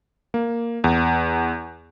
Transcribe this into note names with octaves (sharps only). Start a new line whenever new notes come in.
A#3
E2